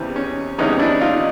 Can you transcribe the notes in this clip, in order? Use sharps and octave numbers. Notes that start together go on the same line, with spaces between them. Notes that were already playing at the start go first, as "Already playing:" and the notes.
Already playing: E2 C#3 E3 G3 C4
C#4
E2 C#3 E3 G3 C#4 D#4
D4 E4
D#4 F4